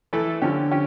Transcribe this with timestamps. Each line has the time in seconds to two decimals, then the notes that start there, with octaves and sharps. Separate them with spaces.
0.13 E3 A3 E4 A4
0.42 D3 F3 C#4 G4
0.71 F3 C#4 G4